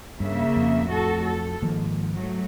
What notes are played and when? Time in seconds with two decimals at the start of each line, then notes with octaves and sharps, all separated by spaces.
0.20 G2 C#3 A#3 E5
0.56 F2
0.87 A2 F#4 A4
1.24 A4
1.62 G#2 D#3 F3 A#3
2.14 F#3 A3